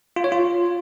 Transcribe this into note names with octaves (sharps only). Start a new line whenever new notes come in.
F4
C#5
F4